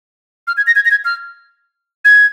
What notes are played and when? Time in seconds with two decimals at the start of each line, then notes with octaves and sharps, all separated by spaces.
0.47 F6
0.57 G#6
0.67 A#6
0.76 G#6
0.85 A#6
0.91 G#6
1.05 F6
2.05 G#6